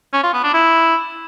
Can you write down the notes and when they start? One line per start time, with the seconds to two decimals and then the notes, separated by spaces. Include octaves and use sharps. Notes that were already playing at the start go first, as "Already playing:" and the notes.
0.14 C#4
0.24 F4
0.34 B3
0.44 D4
0.54 E4